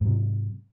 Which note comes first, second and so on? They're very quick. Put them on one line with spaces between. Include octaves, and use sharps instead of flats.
G#2 F#3 C3